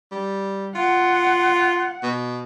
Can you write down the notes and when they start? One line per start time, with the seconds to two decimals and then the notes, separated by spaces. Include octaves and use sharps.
0.11 G3
0.75 F4 F#5
2.03 B2